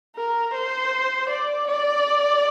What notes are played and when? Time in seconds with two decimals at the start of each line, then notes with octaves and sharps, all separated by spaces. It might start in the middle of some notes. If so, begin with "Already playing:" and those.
0.16 A#4
0.53 C5
1.29 D5
1.67 D5